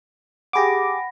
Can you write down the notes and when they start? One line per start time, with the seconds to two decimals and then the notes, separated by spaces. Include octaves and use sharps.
0.53 G4 G#4 F#5 B5 D6 A#6